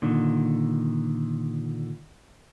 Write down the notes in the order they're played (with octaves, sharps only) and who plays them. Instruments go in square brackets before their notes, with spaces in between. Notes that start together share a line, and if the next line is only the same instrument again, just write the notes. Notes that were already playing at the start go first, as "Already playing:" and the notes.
[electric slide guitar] A#2 D3 D#3